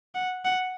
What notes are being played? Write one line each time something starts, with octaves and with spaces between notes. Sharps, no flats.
F#5
F#5